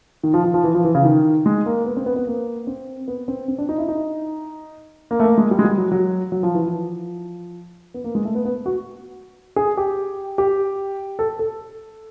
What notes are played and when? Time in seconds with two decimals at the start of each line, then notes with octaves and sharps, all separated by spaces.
0.23 D#3
0.34 F3
0.44 F3
0.54 F3
0.64 E3
0.74 F3
0.84 E3
0.95 C#3
1.05 D#3
1.46 G#3
1.66 A#3
1.86 B3
1.97 C4
2.06 B3
2.16 B3
2.27 A#3
2.67 C4
3.08 B3
3.28 C4
3.48 C4
3.58 D4
3.69 D#4
3.78 E4
3.89 D#4
5.11 A#3
5.20 A3
5.24 A#3
5.38 G#3
5.51 G3
5.59 G#3
5.65 G3
5.78 F#3
5.92 F#3
6.32 F#3
6.43 F3
6.55 E3
6.66 F3
7.94 B3
8.04 A#3
8.15 G#3
8.25 A3
8.35 B3
8.45 B3
8.66 F#4
9.56 G#4
9.77 G4
10.38 G4
11.19 A4
11.39 A4